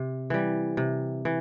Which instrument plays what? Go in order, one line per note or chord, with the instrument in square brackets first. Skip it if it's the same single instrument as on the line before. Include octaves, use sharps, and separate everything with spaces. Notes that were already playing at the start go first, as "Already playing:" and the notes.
Already playing: [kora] C3
E3 G3
C3
E3